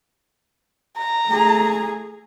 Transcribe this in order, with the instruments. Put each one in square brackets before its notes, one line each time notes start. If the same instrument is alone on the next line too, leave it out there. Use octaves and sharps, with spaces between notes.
[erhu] A#5
[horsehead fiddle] A3 G#4